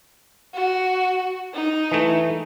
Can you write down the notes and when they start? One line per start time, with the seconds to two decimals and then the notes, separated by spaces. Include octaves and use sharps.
0.54 F#4
1.54 D#4
1.92 E3 A3